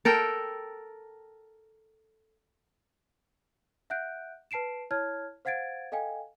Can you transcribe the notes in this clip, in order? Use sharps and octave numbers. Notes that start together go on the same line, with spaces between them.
A4 A#4 G5
E5 F#5 F#6 G6 D7
B4 A5 C7 D7 E7
E4 C#5 A5 F6 G#6
C5 F5 F#5 G#6 A6 D7
A4 D#5 F5 G5 G#5